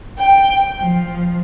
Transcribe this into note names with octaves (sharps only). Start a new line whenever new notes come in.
G5
F3